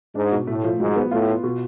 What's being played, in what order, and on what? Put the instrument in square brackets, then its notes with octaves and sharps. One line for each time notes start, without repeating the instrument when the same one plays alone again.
[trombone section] G#2 [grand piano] D4
[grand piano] B2
[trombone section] A2 [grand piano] A3
[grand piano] F3
[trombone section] G#2 [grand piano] F#3
[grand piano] B3
[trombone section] A2 [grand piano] F4
[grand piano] F4
B2